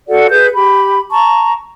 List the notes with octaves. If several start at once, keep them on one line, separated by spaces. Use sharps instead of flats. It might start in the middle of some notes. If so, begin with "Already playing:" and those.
F#4 A4 D5 F#5
G#4 B4 G6
G4 B5
A5 A#5 C#6